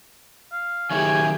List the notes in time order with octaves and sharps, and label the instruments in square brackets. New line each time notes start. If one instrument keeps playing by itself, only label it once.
[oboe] F5
[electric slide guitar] D#3 F#3 E4 [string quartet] G4 G#4 G5 [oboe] C#5 [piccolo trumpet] G#5